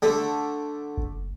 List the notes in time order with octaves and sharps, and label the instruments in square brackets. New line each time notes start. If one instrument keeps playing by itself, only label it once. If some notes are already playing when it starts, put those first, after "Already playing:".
[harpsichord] D3 A3
[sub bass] F#1